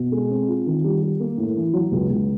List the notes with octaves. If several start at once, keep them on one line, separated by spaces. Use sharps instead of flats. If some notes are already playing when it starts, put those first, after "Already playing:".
Already playing: B2
G#3
C4
F4
D#3
G3
G3
A#3
A2
E3
F#3
C#2
C#2